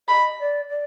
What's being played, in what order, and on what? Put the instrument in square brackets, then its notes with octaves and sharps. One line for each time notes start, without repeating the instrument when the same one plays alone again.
[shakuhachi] D#5 [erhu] B5
[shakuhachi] D5
D5